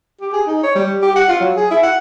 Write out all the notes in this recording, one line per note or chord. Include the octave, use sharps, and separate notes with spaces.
G4
G#4
D#4
C#5
G3
G4
F#5
F4
F#3
G#4
E4
F#5